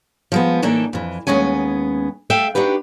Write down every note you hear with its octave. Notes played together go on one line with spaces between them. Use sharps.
F3 G#3 B3
A2 E3 A#3 D4 D#4 A4
F2 E3
D#2 G#3 B3 C#4 G#5
A3 A4 E5 F5 G5
D4 D#4 F#4 G4 B4